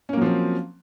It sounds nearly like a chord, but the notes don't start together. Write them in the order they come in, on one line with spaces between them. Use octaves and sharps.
C#4 A#3 F#3 F3 C4